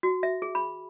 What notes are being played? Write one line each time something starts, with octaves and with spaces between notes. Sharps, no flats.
F#4
E5
G#4
B5